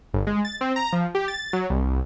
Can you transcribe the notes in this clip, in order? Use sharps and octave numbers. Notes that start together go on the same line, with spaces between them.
G1
G#3
A6
C4
A#5
F3
G4
A6
F#3
C2